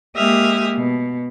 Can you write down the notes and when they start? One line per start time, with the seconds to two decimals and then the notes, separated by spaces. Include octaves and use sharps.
0.16 G#3 A#3 G4 E5 D#6 F6
0.76 B2